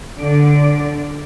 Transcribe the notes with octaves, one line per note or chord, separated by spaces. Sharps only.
D3 D5